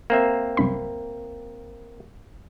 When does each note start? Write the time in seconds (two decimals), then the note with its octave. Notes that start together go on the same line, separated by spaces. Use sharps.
0.10 A#3 C4 E5
0.57 C2 F#2 B5